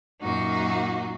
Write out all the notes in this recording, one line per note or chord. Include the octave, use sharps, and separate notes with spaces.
F#2 A#2 D#4 F#4